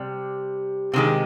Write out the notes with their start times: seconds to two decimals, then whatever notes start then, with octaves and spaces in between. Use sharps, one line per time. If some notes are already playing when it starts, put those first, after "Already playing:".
Already playing: C3 G3
0.94 C3 D#3 G#3